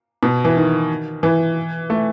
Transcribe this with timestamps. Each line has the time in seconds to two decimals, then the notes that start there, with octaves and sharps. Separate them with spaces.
0.23 B2
0.45 E3
0.57 D#3
1.23 E3
1.90 A3